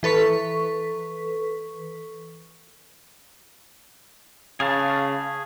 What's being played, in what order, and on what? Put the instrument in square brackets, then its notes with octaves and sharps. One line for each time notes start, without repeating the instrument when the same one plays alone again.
[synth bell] E3 A4 B4 C#6 B6
[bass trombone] C#3 [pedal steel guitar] G#4 F5 A5